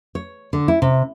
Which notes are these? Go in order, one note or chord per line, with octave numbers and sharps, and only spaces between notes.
C#5
D3
E4
C3